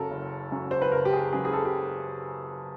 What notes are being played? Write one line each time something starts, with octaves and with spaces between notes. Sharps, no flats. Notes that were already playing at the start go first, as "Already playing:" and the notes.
Already playing: F#1 F#2 C#3 F#3 A4 A#4
F#1
F#2 C#3 F#3
C5
B4
F#1 A#4
G4
G#4
F#2 C#3 F#3 G#4
G#4
A4
G4